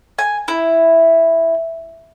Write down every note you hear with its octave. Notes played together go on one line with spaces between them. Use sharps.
G#5
E4